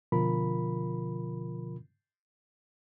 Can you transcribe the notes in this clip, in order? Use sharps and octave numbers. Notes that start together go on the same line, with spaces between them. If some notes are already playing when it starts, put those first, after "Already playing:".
B2 D3 F3 F4 A#4 B5